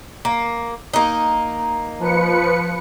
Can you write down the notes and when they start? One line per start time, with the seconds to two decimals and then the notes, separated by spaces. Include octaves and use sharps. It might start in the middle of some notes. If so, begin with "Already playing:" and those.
0.25 A#3
0.94 A#3 D#4
1.99 F3 B4 C#7